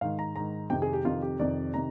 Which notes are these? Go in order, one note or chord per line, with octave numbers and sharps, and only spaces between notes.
G#2 D#3 F5
A#5
G#2 D#3 A#5
F2 C3 D#3 G5
G#4
G4
F2 C3 D#3 F4
G4
F2 C3 D#3 D5
C3 D#3 A#5